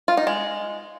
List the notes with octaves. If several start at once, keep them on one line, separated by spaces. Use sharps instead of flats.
F4
D#4
G#3